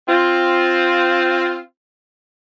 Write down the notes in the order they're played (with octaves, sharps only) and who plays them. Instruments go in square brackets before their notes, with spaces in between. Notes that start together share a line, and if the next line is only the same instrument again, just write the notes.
[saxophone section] C4 F4